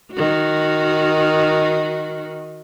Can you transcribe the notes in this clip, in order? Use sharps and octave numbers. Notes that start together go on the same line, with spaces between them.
D#3 F#4